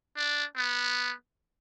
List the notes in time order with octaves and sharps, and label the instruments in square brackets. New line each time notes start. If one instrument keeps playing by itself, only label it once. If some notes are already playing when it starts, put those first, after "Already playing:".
[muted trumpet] D4
B3